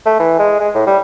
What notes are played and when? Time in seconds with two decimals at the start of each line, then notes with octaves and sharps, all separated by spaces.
0.06 A3
0.19 E3
0.39 G#3
0.60 G#3
0.75 A2
0.87 G3